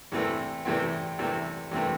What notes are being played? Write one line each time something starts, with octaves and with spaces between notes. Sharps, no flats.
E2 C3 E3 A3 C4
E2 C3 E3 A3 C4
E2 C3 E3 A3 C4
E2 C3 E3 A3 C4